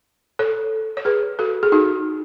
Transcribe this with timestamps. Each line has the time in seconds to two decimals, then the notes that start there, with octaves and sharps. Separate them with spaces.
0.39 A4 C#5
0.97 C#5
1.05 G#4 B4
1.39 F#4 A4
1.63 G#4
1.72 D#4 F#4